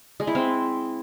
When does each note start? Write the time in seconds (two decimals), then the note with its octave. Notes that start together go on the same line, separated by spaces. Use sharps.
0.20 G#3
0.27 E4
0.35 C4